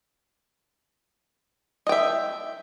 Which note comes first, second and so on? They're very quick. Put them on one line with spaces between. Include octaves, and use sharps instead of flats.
D#5 G5 E5